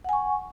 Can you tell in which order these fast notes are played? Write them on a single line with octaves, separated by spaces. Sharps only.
F#5 G#5 C#6